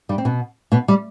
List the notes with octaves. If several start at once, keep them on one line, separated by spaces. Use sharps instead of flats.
G2 G3
C4
B2 B3
B2 B3
G3